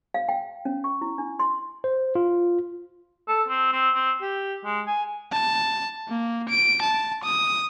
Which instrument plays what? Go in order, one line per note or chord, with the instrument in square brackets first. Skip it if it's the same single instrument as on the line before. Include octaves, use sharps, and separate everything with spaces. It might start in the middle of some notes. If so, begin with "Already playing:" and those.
[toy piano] F5
G5
C#4
C#6
E4
D4
C6
[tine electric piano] C5
F4
[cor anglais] A4
C4
C4
C4
G4
G#3
G#5
[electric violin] A5
A#3
D7
A5
D#6